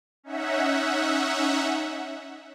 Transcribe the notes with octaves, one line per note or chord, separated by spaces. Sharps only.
C#4 D#4 E5 F#5